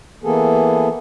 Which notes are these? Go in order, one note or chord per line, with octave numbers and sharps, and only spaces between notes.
E3 A#3 B3 G#4 A4